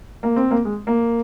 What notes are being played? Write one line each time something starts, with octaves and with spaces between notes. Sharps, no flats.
A#3
C4
A#3
G#3
A#3